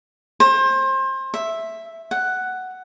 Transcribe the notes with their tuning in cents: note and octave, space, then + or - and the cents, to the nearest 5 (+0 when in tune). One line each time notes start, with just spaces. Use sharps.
C5 +30
E5 +0
F#5 +5